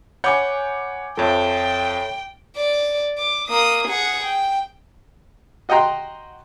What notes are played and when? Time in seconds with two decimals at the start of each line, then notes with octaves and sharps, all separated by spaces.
0.24 C#5 F#5 G#5 B5 D6 G6
1.17 F2 F3 A4 C#5 E5 G5
2.57 D5
3.18 D6
3.48 A#3 D#6
3.88 G#4 F#5
4.25 G5
5.69 F#4 D#5 F#5 G5 A#5 C6